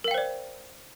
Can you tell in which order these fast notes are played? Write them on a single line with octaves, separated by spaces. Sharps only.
A#4 F5 G5 C5 D5